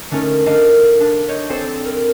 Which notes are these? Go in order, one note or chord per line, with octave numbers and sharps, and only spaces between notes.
D3 A3 C#4 D#4 A#4
D4 A4 A#4 D#5 F5 F6
D4
C#5 D#5 G6
C4 G#4 A4 C5 D5
A#4